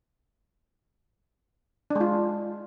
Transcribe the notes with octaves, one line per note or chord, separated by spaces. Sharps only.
D4
G#3
F4